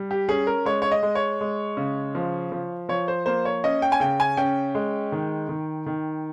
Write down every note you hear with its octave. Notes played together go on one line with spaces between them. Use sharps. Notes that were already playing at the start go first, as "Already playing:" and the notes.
Already playing: G3
G4
C#4 G#4
A#4
G#3 C#5
C#5
D#5
G#3
C#5
G#3
C#3
F3
F3
F3 C#5
C5
A#3 C5
C#5
C#4 D#5
G5
G#5
C#3 G5
G#5
C#4 G5
G#3
D#3
D#3
D#3